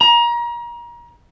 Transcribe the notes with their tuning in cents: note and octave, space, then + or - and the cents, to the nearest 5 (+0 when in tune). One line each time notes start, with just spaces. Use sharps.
A#5 +30